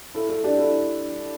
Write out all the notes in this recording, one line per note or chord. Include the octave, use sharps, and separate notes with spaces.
E4 A4
E4 A4
D4 G4
E4 A4